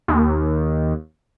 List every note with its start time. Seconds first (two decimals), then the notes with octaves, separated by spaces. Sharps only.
0.08 D#2